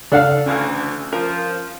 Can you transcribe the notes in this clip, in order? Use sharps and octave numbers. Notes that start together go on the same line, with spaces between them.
C#3 D4 A4 F5 F#5
D2 E3 C#4
F3 A#4